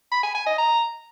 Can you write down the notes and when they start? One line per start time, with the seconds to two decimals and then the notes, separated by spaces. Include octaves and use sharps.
0.12 B5
0.23 G#5
0.35 G#5
0.47 D#5
0.58 A#5